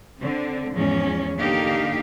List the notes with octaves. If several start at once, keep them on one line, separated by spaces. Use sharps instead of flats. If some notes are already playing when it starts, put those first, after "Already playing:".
D3 C4
E2 G#2 F3 C#4
D3 A#3 D#4 G4 F5